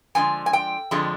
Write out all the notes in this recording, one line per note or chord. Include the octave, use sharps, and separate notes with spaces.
F2 D3 F3 G#3 G#5
G#5
G5
F2 D3 F3 G#3